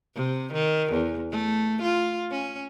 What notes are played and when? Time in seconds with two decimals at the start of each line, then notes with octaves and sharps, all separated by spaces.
0.15 C3
0.53 D#3
0.92 E2
1.31 A3
1.82 F4
2.31 C#4